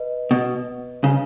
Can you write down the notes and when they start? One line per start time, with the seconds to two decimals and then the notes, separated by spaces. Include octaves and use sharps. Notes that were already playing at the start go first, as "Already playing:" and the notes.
Already playing: B4 D#5
0.31 B2
1.04 C#3